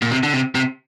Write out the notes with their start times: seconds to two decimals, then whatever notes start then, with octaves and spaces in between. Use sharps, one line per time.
0.02 A#2
0.11 C3
0.23 D3
0.34 C3
0.55 C3